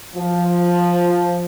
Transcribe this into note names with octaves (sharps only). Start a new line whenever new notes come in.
F3